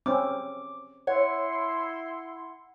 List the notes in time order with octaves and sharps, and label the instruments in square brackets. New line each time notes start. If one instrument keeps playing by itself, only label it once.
[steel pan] C4 C#4 [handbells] D6
[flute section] E4 C6 [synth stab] C#5 [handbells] F#5